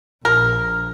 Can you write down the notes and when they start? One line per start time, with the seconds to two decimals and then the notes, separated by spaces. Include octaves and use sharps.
0.25 A#1 A#4